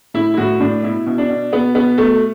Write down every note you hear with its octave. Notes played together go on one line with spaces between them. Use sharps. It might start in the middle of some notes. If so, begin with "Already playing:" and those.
A2 E4
E4
A2 F#4
A2 D4
B2 E4
B2
D4
B2
B2 B3
B2 B3
B2 A3